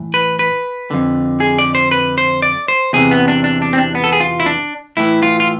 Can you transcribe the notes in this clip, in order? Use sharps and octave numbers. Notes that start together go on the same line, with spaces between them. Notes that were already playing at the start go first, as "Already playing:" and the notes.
Already playing: A2 E3
B4
B4
F2 D3
G#4
D5
C5
B4
C5
D5
C5
E2 C3 E3 G#4
B3
D4
D4
D4
C4
D4
B3
A4
G#4
F4
E4
D4
A2 E3 E4
F4
F4